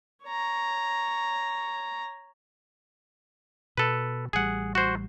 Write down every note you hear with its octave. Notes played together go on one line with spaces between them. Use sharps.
C#5 A#5
B2 A4 B4
A1 G3 G#4 F#5
F#4 C5